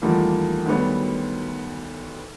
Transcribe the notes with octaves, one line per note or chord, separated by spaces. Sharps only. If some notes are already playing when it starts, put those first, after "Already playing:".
E2 D#3 F3 G3 A3 A#3
D2 D#3 F#3 G3 B3